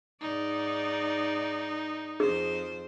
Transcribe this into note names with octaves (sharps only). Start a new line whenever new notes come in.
G#2 D#4 D5
F2 G#4 C5